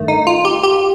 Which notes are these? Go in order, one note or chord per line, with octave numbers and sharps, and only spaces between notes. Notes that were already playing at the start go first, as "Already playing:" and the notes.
Already playing: G2 D#3 A3
D#4
F4
G4
G4